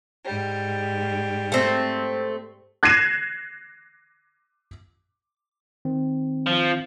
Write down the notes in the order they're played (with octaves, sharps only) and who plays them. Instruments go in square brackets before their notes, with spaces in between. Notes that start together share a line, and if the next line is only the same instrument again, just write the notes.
[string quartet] G#2 G3
[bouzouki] A3 C4
[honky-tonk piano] F#6 G#6 A#6 C7 D#7 E7
[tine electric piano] D#3 C4
[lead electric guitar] F3